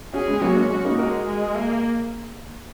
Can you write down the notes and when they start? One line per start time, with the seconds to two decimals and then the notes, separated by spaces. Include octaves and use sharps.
0.13 C#4 F#4 G#4
0.28 G#3
0.41 F#3 A#3 F#4
0.56 G#3 C#4
0.70 G#3 C#4
0.85 A#3 D#4
0.98 G#3 F#4 A#4
1.27 G#3
1.55 A#3